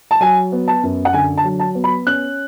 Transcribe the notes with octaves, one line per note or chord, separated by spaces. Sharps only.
A5
F#3 G#5
B3
A5
F#2
F#5
D3 G#5
A5
F#3
A5
B3
B5
C#4 F#6